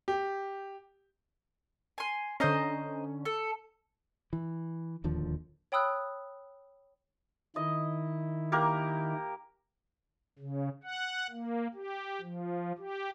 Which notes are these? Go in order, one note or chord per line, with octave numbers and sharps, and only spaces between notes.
G4
G#5 C6
D3 C#4 C5 D#5 A#5
A4
E3
D1 D#2 D3 F3
C#5 G5 B5 D#6 E6 F#6
D#3 E4 D#5
A#3 G4 A#4
C#3
F#5
A#3
G4
F3
G4